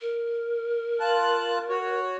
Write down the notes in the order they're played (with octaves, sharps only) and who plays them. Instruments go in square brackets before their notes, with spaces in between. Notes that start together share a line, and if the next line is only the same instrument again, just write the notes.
[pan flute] A#4
[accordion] F4 A5 F#6
F#4 C#5